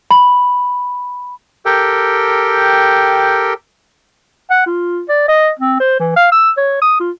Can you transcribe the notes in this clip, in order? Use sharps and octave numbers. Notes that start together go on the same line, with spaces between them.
B5
G4 A4 A#4 G5
F#5
F4
D5
D#5
C4
C5
E3
F5
E6
C#5
D#6
F4